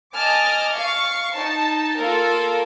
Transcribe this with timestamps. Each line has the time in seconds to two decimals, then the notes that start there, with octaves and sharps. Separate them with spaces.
0.14 D#5 G#5 A5 D6 F6
0.75 F5 C#6
1.36 D#4 A5
2.00 A#3 F4 A4 A#4